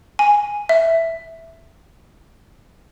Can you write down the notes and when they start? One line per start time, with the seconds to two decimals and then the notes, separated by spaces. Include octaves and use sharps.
0.19 G#5
0.69 E5